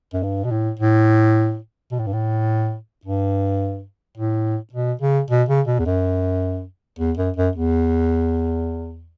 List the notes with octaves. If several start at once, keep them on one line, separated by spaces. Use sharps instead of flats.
F#2
G2
B2
A2
A2
B2
A2
G2
A2
G2
A2
B2
C#3
B2
C#3
B2
E2
F#2
E2
F#2
F#2
E2